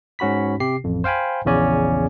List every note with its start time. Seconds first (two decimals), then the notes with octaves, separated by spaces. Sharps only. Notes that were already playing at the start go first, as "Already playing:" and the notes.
0.19 G#2 C#4 F#4 B5 B6
0.60 C3 G4 C7
0.84 A1 F2
1.04 C5 F5 G5 G#5 B5
1.45 A#1 E2 C#3 C#4 D5 G#5